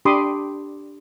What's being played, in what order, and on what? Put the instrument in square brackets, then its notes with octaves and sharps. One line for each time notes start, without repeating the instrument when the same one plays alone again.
[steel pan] D4 G4 B5 C6 D6 D#6